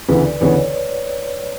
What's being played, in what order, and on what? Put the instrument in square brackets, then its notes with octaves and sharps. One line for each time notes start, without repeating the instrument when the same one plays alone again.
[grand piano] D2 C#3 E3 B3 [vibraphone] B4
[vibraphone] D5
[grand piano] D2 C#3 E3 B3 [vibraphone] C#5